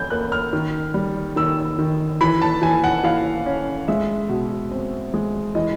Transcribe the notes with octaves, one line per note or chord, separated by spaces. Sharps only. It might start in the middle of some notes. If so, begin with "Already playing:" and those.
Already playing: C#4 G6
A#3 F#6
F6
D#3
G3
D#3 E6
D#3
E3 B5
A5
E3 G#5
F#5
E3 F5
C#4
G#3 E5
B2
C4
G#3
E3 D#5